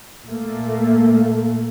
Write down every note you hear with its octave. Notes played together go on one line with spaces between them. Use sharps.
A#2 A3 A#3